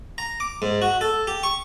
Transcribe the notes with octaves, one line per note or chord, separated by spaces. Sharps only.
A#5
D6
G#2
F#4
A4
G4
C#6